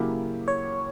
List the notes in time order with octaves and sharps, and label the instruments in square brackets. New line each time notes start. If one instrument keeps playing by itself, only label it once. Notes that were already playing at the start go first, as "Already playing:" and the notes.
Already playing: [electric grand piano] C#3 F#3 A#3 E4 G4
[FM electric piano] C#5